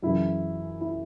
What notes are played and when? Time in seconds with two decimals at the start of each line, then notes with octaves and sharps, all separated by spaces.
0.02 F#2 C#3 E3 E4
0.81 E4